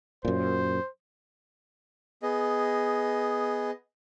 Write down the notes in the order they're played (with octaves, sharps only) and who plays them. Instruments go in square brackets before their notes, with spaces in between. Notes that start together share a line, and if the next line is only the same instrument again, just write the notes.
[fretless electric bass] F#2 A#2 [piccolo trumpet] C5
[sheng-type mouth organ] B3 G#4 D#5